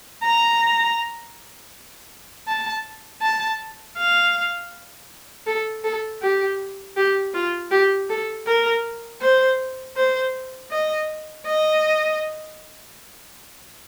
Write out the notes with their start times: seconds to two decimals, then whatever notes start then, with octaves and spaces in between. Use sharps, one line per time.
0.23 A#5
2.47 A5
3.22 A5
3.97 F5
5.46 A4
5.84 A4
6.21 G4
6.96 G4
7.34 F4
7.71 G4
8.09 A4
8.46 A#4
9.21 C5
9.96 C5
10.71 D#5
11.46 D#5